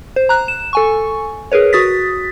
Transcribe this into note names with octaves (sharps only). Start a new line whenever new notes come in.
C5
A#5 F#6
E7
A4 G#5 C#6
G#4 A#4 B4 C#5
F#4 D#6 A6 B6